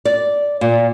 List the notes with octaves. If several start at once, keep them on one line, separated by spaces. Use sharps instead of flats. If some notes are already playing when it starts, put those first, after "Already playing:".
D5
A#2